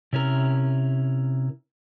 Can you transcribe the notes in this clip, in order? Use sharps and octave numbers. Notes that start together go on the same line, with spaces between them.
C3 C#4 E4 A#4